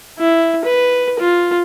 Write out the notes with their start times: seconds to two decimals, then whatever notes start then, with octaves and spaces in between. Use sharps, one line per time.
0.19 E4
0.65 B4
1.19 F4